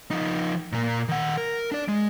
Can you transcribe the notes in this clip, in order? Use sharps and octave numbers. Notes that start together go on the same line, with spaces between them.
F3 D#4
A#2 A#3
D#3 F#5
A#4
D4 D5
G#3